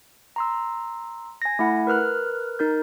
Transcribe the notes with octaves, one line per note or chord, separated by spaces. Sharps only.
A#5 C6 E6
G#5 A#6
A3 E4 F#5 B5
A#4 B4 F6 F#6
D#4 A#4 G6